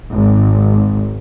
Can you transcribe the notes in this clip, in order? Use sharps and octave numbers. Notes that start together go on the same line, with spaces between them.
G#1